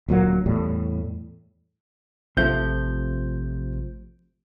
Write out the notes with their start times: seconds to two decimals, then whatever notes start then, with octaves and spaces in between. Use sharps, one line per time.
0.08 D1 A#2 F#3 A#3
0.46 E2 A2 G3
2.37 A1 C3 F3 A3 G6